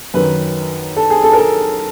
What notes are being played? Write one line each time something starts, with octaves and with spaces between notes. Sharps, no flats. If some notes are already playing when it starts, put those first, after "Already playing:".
F#2 D#3 B4
A4
G#4
A4
A#4
A4